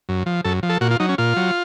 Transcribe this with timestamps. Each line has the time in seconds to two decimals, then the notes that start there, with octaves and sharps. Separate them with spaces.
0.09 F#2
0.26 F3
0.44 F#2 A4
0.63 F3
0.69 A4
0.81 A#2 F#4
0.91 F4
1.00 F#3 D#4
1.09 C#4
1.18 A#2 F4
1.36 F#3